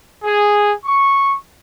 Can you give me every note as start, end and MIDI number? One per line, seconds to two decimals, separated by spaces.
0.24 0.74 68
0.85 1.36 85